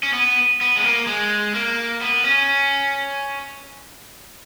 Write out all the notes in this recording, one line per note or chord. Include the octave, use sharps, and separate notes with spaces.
C#4
B3
B3
G#3
A#3
G#3
A#3
B3
C#4